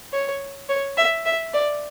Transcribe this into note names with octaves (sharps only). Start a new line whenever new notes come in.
C#5
C#5
E5
E5
D5